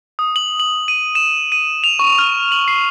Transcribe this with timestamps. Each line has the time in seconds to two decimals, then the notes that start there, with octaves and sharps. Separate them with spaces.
0.19 D#6
0.36 F#7
0.60 F#7
0.88 D#7
1.15 E7
1.52 D#7
1.84 F7
1.99 C#6
2.19 F6
2.52 F#7
2.68 C7